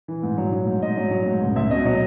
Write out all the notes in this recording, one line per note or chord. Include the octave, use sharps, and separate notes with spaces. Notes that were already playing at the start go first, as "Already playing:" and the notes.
E3
G#2
F#3
F#3
G#2
G#2 D#5
F#3
F#3
G#2
C#2
C#2 E5
B2 D#5
F#3 D#5